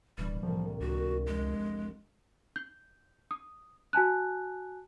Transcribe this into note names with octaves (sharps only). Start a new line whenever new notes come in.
D1 B2 E3 G3 D4
C2 A2 F3 A#3
C#2 D4 F#4 A#4
F1 G#3 D#7
G6
D#6
F#4 G#5 A5 F#6